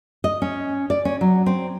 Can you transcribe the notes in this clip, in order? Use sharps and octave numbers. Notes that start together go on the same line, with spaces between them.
D#5
C#4
D5
C#4
F#3
C4